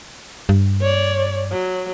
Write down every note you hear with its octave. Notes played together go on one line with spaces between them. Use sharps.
G2
C#5 D5
F#3